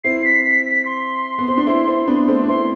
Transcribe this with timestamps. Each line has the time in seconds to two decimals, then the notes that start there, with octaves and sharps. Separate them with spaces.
0.04 C4 E4 C7
0.25 B6
0.45 B6
0.66 B6
0.86 C6
1.38 B3
1.48 C4
1.57 D4
1.67 C4 E4
1.87 C4 E4
2.07 B3 D4
2.28 A3 C4
2.43 D4
2.48 C4 E4 C6